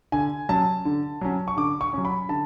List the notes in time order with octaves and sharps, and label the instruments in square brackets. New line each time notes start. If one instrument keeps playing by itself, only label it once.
[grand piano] D3 G#5
F#3 C#4 A5
D3
F#3 C#4
C#6
D3 D6
C#6
F#3 C#4
B5
D3 A5